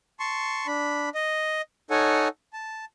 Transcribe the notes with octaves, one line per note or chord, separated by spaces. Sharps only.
A5 C6 C#6
D4 B5
D#5
D#4 A4 C#5 F#5 G#5
A5